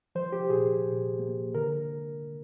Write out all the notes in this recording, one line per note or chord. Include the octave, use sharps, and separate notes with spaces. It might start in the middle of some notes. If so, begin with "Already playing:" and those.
F3 C5
G4
A#2 G#4
A#2
A#3
D3 A#4